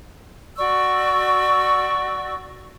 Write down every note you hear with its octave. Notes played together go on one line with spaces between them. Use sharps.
F#4 D5 C#6 E6